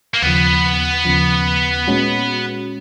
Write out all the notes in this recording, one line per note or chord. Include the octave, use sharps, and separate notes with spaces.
A#3
D#2 C#3 F3 B3
D#2 C#3 F3
A#2 G#3 C#4 F#4